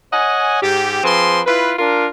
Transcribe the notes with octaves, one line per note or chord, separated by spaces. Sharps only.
C#5 D#5 F#5 G#5
G#2 G4
F3 C4 G#4 B4 C6
E4 F4 B4
D4 F4 A#4